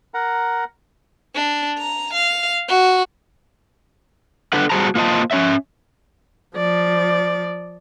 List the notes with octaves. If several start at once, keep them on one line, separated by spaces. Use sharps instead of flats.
A#4 F#5 A#5
D4
A#5
F5
F#4
D4 A4 B4 F#5
G3 F#4 G#4 C5 A5 A#5
A#3 F4 C5 D#5 A5
C#4 C#5 E5
F3 D5